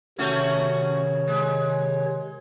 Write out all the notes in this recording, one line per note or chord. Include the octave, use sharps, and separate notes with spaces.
C3 D#3 A3 C#4 F#4 C#5
G#3